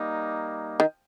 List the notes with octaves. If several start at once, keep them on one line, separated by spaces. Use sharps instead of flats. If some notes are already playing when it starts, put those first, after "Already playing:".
Already playing: G3 A#3 D#4
D#3